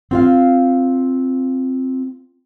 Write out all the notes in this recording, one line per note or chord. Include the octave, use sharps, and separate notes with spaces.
C4 F4 F5